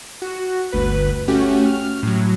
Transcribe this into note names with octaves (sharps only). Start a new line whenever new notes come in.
F#4
G1 D2 B4
A3 C#4 F#4 G4
F6
A2 F#3